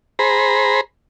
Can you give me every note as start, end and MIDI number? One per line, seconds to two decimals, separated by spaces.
0.19 0.81 68
0.19 0.81 72
0.19 0.81 82
0.19 0.81 83